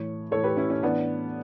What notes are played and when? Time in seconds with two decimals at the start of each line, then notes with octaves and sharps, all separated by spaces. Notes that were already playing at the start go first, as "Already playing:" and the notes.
Already playing: A2 E3 C#5
0.31 A2 E3 A4 C#5
0.44 G4 B4
0.57 C#4 E4
0.70 C#4
0.83 A2 E3 B3 D4